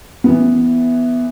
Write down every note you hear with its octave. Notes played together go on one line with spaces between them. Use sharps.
E3 B3